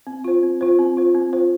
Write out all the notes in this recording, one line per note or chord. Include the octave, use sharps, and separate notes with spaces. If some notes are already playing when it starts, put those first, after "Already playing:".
C4
F4 C5
C4
F4 C5
C4
F4 C5
C4
F4 C5